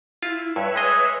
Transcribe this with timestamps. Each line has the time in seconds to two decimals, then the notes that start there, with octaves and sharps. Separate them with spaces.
0.23 E4 F4
0.56 G2 B4 C#5 E5
0.76 G#3 G#4 D#5